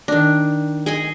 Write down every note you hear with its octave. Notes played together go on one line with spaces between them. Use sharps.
D#3 D4
G#4 D#5 G#5